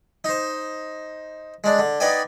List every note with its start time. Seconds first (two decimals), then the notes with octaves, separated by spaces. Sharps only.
0.24 D#4 C5
1.64 G#3 D4
1.79 D3
2.00 B3 D#4 D5 G5 G#5